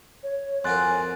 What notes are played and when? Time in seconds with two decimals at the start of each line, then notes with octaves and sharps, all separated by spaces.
0.23 C#5
0.64 F2 F#4 A#4 G#5 C6 F#6 A6